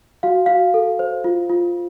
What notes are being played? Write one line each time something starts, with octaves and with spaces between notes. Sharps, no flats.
F#4 F5
F#4 F5
A4
C5
F4
F4